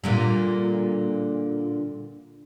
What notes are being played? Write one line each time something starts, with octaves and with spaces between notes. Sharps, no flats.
A#2 D3 G3